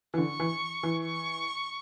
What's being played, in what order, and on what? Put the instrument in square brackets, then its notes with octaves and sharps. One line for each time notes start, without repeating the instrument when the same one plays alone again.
[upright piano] E3
[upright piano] D3 [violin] C#6
[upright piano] E3
E3
[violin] C#6